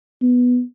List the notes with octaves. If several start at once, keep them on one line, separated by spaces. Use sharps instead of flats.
B3